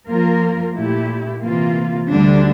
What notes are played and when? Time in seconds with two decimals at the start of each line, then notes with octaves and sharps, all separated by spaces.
0.09 F3 A#3 F4 A#4
0.76 A#2 A3 E4 G4
1.42 C3 E3 A#3 F4
2.10 D2 D3 G3 D4